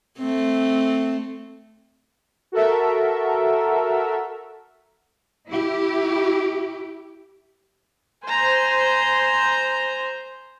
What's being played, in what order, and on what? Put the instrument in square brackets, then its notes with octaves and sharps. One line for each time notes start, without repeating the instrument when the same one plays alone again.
[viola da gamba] A3 C4
[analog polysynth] F#4 A4 A#4 E5
[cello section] E4 G4
[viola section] C5 [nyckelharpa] G#5 A#5